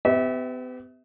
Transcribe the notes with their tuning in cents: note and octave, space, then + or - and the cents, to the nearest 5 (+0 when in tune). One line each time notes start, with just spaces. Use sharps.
B3 +40 G4 -5 E5 -25